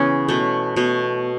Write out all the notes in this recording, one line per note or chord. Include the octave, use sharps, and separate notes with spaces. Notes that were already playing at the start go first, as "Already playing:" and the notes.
Already playing: C#3 E3 B3 C#4
B2 A3
B2 A3